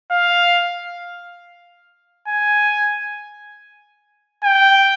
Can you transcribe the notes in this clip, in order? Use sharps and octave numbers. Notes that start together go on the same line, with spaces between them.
F5
G#5
G5